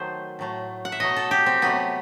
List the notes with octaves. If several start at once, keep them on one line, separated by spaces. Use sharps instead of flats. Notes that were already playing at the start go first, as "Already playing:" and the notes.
Already playing: D#3 F#3 A3 C5
A2 F#3 A3
F#5
E5
B2 F#3 A3 D#5
A4
G4
C4
C3 F#3 A3 B3